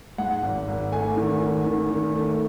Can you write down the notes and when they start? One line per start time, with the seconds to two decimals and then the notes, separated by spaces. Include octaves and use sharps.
0.18 G#2 F#5
0.43 G#1
0.68 G#1
0.92 A3 G#5
1.17 D#3
1.41 D#3
1.66 D#3
1.90 D#3
2.15 A3